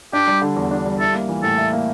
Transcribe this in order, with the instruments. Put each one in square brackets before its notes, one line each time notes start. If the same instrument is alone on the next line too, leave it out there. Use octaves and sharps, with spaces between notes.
[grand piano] D4 [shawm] G4
[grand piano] G3
D3
E2
D4
G3
[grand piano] E4 [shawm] A4
[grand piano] A#3
E3
[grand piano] A2 [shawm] A4
[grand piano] E4
A#3